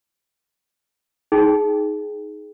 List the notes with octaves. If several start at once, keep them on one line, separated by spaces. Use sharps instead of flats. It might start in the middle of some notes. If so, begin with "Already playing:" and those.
D#4 G#4 G5